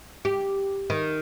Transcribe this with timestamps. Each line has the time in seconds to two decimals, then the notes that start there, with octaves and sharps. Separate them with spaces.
0.25 G4
0.90 D#3